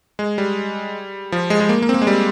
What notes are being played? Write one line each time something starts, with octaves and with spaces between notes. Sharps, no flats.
G#3
G3
F3
G#3
G#3
A#3
A#3
C4
A#3
G#3
G3